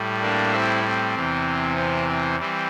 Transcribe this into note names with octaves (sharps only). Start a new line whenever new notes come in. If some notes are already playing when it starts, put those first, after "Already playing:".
Already playing: A2 G3
A#3 D4
C4 E4
C4
E2 C3 E3
C4
C4
E3 G3 C4